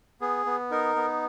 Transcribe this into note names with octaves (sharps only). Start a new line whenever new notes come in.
B3 G#4
B3
D#4 A#4
B3